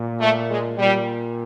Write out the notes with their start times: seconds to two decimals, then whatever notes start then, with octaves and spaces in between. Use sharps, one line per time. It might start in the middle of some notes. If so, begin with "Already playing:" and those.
Already playing: A#2
0.20 A3
0.50 G#3
0.78 A#2 G3